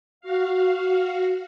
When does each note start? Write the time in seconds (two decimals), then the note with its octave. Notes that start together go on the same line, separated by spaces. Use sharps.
0.21 F#4 F5